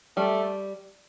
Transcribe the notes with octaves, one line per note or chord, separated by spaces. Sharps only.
G3 A3